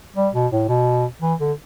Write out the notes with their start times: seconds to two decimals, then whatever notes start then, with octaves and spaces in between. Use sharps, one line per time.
0.17 G3
0.34 B2
0.52 A2
0.68 B2
1.22 E3
1.40 D3